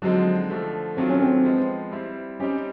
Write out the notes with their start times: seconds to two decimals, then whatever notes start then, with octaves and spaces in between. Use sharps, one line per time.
0.02 D3 F3 F#3 G#3 C4 D#4
0.50 D3 F3 A3
0.97 D#3 F#3 A3 C4 D4 F4
1.10 C#4
1.22 C4
1.44 F3 G#3 B3
1.92 G3 C4 E4
2.40 G3 C4 C#4 D#4 G4